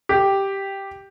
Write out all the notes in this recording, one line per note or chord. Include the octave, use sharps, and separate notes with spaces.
G4